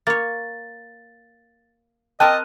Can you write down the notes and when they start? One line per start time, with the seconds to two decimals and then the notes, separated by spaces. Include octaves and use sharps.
0.07 A#3 C#5 A6
2.20 C4 G4 A#4 D#5 G5 A5 F#6 D#7